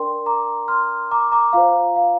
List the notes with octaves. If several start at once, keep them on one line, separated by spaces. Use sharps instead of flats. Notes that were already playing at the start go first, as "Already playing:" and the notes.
Already playing: D4 A#4 D5 G5 C6
A#5 D6
C6 F6
A#5 D6
A#5 D6
F4 C5 F5 A#5
F5